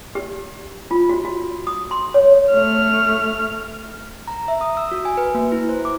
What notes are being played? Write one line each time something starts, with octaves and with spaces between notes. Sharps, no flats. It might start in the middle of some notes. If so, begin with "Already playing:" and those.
G4
F4
F#4
F#4
D#6
C6
C#5
A3 F6
A#5
E5
D#6
E6
F#4
G#5
B4
A#3
E4
C5
D6